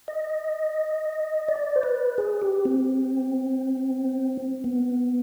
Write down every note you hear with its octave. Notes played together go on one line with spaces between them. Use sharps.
D#5
D5
C5
B4
G#4
G4
C4
B3